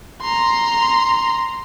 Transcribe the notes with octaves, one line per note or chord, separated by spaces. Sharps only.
A#5 C6